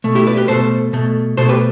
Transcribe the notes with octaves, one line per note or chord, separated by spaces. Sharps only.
B2 A3
E4 G4
B4 D5
G4 B4
B2 A3 A4 C5
B2 A3
B2 A3 A4 C5
G4 B4